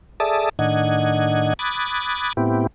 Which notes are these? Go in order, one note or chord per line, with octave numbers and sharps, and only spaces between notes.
G#4 A4 D5 E5 A5 D#6
A2 D#3 D4 D#5 F#5 G#6
B5 D6 D#6 F#6 G#6 A6
A2 B3 C4 E4 G4